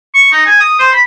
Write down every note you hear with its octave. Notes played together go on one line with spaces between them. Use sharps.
C#6
D#4
G#5
D#6
C5
B5